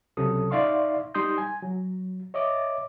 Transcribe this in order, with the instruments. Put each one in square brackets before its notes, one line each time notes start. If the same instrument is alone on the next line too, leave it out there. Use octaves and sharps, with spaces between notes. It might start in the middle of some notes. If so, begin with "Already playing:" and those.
[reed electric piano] C#2 C3 F#3 C#4 A4 D#6
D#4 D5 E5 F5 C6 C#6
G3 D#4 C6 D#6 G6
G#5
F#3
C#5 D#5 E5 D6